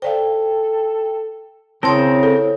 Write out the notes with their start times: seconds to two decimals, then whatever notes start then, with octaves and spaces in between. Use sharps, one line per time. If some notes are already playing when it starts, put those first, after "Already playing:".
0.02 A4 C5 D5 F5 G5
1.83 C#3 C4 E4 A#4 C#5 A5 C6 D#6
2.23 A4